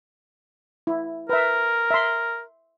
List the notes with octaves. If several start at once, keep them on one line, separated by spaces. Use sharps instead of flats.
E4
A#4 B4 E5
E5 C6